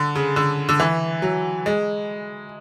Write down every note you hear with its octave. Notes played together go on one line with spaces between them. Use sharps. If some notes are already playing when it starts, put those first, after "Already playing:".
Already playing: D3
C#3
D3
D3
E3
F#3
G#3